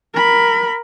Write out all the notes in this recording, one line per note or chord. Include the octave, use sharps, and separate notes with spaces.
A#4 B5